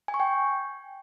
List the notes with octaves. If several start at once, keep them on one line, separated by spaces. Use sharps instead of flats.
G#5
C#6
G5